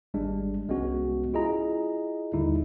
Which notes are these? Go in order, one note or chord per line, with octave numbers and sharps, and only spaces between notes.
G#1 G3 G#3 D4
C2 G#3 B3 C#4 F#4
E4 F4 G#4 D#5 A#5
D#2 D3 G3 D#4 E4